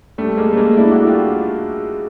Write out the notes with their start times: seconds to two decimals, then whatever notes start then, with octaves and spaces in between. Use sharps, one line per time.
0.18 G3 A3
0.37 G#3 A#3
0.53 A3
0.57 G#3 A#3
0.77 D4 E4
0.91 E4 F#4
1.07 F4 G4